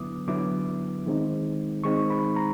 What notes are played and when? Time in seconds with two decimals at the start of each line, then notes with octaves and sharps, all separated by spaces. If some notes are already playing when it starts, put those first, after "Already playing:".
Already playing: D3 F#3 B3 E4 D6 D#6
0.28 D3 F#3 B3 E4 D6
1.06 D#3 G#3 C4 D#4
1.84 D#3 G#3 C4 D#4 C#6
2.10 B5
2.36 A#5